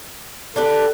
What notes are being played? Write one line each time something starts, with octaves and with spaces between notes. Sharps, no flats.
D4 G4 A4 B4